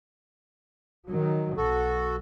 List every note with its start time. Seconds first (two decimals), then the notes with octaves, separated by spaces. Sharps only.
1.07 D#3 F#3
1.57 B1 F#4 A4